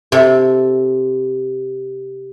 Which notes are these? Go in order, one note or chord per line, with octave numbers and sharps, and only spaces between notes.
C3 A4